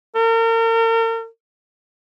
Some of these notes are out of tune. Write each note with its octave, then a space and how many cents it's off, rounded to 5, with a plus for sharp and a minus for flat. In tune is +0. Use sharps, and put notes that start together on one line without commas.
A#4 -40